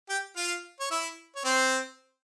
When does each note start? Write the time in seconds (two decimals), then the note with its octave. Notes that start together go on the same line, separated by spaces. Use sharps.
0.09 G4 G5
0.36 F4 F5
0.80 C#5
0.91 E4 E5
1.36 C#5
1.45 C4 C5